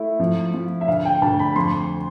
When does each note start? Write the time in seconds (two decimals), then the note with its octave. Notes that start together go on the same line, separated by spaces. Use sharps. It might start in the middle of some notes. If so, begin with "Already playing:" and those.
Already playing: A3 E4
0.20 F3
0.54 F3
0.81 E5
0.88 D2 F5
1.05 G5
1.22 D2 A5
1.39 B5
1.56 F2 C6